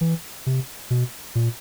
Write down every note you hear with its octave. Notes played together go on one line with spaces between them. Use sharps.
E3
C3
B2
A#2